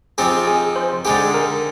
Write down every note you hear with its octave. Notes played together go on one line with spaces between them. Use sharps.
F3 C4 D#4 G4 G#4 G#5
G#4 G#5
C5 C6
D3 G#3 D#4 G4 G#4 G#5
A#4 A#5